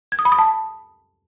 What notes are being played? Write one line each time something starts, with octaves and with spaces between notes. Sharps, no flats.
G#6
D#6
B5
D#6
A5